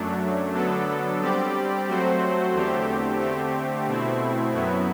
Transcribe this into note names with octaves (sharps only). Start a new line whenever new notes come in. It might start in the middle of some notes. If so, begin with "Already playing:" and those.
Already playing: F#2 F#3 A3 D4
D3 F#3 B3 D4 A4
G3 C4 G4 D5
F#3 A3 C4 F#4 C5
E2 D3 A3 C4 G4
D3 A3 C4 G4
B2 A3 C4 E4
F#2 F#3 B3 E4